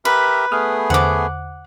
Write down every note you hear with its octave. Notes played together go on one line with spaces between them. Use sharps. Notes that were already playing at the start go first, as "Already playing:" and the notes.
G4 A#4 B4 E5
A3 B3 G#4 D#6 F6
E2 D3 C5 F#5 D6